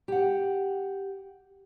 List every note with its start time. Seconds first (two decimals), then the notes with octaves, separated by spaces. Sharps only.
0.08 G4 F#5